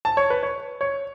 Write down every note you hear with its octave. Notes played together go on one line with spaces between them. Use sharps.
A5
C#5
B4
C#5
C#5